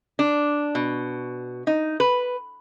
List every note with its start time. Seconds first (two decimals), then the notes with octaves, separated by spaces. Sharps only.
0.19 D4
0.75 B2
1.67 D#4
2.00 B4